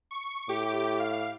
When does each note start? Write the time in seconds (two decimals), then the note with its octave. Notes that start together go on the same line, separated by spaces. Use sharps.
0.11 C#6
0.49 A2 G4 D6
0.99 F5